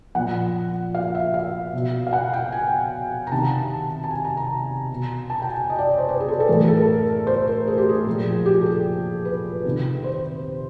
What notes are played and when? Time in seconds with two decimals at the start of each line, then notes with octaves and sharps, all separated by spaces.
0.15 A#2 F3 F#5
0.95 F5
1.15 E5
1.34 F5
1.73 B2
2.07 F5
2.13 F#5
2.33 G5
2.52 G#5
3.27 A#5
3.31 C3 D#3 A5
4.04 A5
4.11 G#5
4.24 A#5
4.37 A#5
4.90 B2
5.30 A5
5.42 G5
5.49 G#5
5.70 D#5
5.78 D5
5.89 C#5
5.98 C5
6.09 B4
6.20 G#4
6.28 A4
6.40 A4
6.48 A2 E3 A#4
6.59 G#4
6.68 A4
6.77 A#4
7.27 C5
7.47 A#4
7.67 G#4
7.78 G4
7.89 G#4
8.06 A#2 F3
8.46 G4
8.61 A4
8.66 G#4
9.25 B4
9.64 C3 D#3
10.04 C5